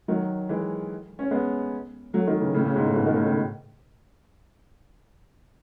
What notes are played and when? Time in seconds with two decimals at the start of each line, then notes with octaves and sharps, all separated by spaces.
0.08 D#3 F#3
0.49 E3 G#3
1.19 C#4
1.31 G#3 B3
2.14 F#3 A3
2.27 D#3 F#3
2.41 C#3 E3
2.54 A2 C#3
2.65 A2 C#3
2.76 G#2 B2
2.86 A2
2.96 G#2 B2
3.06 B2 D#3
3.16 A2 C#3
3.27 A2 C#3